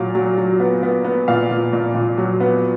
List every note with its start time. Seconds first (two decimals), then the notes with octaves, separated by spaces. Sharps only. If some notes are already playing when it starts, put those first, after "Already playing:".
Already playing: A#2 F#3 F5
0.15 F#3
0.37 F#3
0.60 B3
0.83 B3
1.04 B3
1.28 A#2 F5
1.50 A#2
1.73 A#2
1.95 A#2
2.18 F#3
2.40 B3